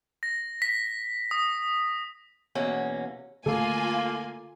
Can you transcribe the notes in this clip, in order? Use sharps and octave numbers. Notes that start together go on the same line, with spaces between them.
A#6
B6
D#6
E2 B2 A#3 C#4
D3 A3 A#3 F4 A4 G#5